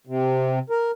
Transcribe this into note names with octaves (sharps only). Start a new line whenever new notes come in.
C3
A#4